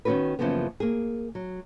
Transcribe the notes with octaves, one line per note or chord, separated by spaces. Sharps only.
D#3 B3 C#4 F#4 A#4 B4
F#2 C#3 E3 F3 A#3 B3
A#3 G#4
F#3